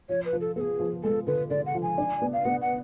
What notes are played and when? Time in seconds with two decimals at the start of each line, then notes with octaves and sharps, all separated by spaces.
0.09 F3 C#5
0.25 B4
0.33 F3
0.41 A4
0.56 B3 A4
0.60 G#4
0.80 F3
1.03 G#3 A4
1.27 D3 B4
1.50 D3 D5
1.66 F#5
1.74 F3
1.82 G#5
1.98 D4
2.22 B3
2.33 F5
2.45 B3 F#5
2.61 F#5